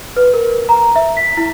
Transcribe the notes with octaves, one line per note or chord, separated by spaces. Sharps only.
B4
A#4
A#5
E5
B6
E4